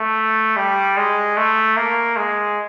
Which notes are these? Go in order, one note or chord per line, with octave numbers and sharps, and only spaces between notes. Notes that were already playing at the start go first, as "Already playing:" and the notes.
Already playing: A3
G3
G#3
A3
A#3
G#3